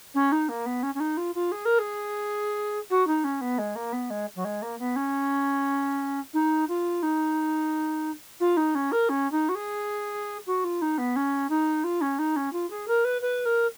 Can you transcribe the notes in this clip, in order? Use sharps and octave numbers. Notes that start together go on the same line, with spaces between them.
C#4
D#4
A#3
B3
C#4
C#4
D#4
F4
F4
G#4
A#4
G#4
F#4
D#4
C#4
B3
G#3
A#3
B3
G#3
F#3
G#3
A#3
B3
C#4
D#4
F4
D#4
F4
D#4
C#4
A#4
C#4
D#4
F#4
G#4
F#4
F4
D#4
B3
C#4
D#4
F4
C#4
D#4
C#4
F4
G#4
A#4
B4
B4
A#4